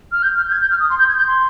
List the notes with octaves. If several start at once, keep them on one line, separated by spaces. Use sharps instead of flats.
F6
G6
F6
G6
G#6
G6
F6
D#6
C6
G6
G#6
G6
C6